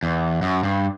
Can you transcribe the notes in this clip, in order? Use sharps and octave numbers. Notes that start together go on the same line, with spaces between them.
E2
F#2
G2